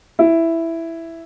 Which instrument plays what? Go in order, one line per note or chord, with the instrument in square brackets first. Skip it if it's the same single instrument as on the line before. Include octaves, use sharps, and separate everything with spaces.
[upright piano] E4